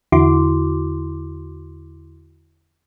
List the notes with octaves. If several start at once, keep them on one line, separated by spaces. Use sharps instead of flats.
E2 D3 E4 F#4 C6 D6